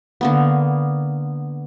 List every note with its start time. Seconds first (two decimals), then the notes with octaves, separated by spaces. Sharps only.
0.21 D3 A#3 B3